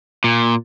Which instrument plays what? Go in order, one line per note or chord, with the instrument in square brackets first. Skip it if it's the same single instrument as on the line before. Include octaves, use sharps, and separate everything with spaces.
[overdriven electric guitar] A#2